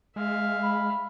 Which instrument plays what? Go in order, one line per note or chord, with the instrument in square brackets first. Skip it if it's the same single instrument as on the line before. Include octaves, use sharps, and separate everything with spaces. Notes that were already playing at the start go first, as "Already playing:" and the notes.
[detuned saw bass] G#3 [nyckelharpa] E5 F5
[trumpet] B5